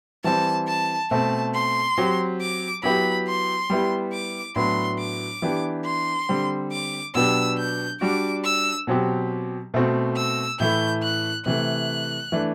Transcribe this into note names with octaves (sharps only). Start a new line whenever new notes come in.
E3 G3 C4 A5
A5
B2 A3 C4 A5
C6
F#3 C4 G4
D6
F#3 B3 E4 G4 B5
C6
G3 B3 E4 G4
D6
A2 F#3 B3 D4 C6
D6
E3 B3 D4 G4
C6
D3 G3 C4
D6
B2 F#3 B3 D4 G4 E6
G6
G3 D4 F#4 D6
E6
B2 F#3 C4 G4
B2 A3 C4 F#4
E6
A2 E3 A3 E4 G6
F#6
C3 E3 A3 F#6
E3 A3 D4